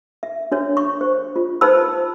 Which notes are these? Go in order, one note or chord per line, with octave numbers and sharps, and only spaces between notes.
E5
D4 F#4 C#5
C#6
C5
F4
D#4 B4 C5 A5 B5 E6